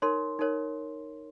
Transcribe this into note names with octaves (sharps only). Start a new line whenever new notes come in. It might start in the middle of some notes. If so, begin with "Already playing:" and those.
D#4 A#4 C#5 C6
D#4 A#4 C#5